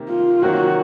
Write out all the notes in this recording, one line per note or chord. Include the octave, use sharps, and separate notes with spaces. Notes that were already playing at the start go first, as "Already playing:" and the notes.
Already playing: C3 D#3 A#3
F4
C3 D#3 F#3 A#3 F#4